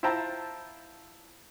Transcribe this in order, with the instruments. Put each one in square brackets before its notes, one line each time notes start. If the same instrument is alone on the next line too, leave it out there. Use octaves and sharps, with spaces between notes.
[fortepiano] E4 F4 C5 G5 A5 A#5